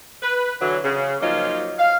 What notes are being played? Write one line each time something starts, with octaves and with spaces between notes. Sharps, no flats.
B4
D3 E3 F#3
C#3
F3 F#3 A#3 C#4 D#4 F4
F5